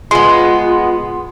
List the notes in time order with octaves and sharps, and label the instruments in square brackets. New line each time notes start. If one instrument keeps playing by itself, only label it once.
[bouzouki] G#3 B3 [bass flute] F4 [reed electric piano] C6